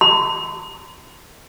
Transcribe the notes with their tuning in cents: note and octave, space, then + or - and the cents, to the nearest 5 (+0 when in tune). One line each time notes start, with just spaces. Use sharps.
C6 -40